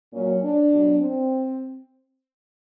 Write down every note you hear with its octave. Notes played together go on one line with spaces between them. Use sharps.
A#2 F#3 C#4
D4
B2 F#3
C4